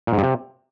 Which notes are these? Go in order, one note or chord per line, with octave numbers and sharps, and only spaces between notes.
A#2
G#2
G2
C3